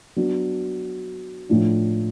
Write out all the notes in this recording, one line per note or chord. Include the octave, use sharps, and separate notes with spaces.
F#3 B3 D4 F#4
A2 F3 A3 D4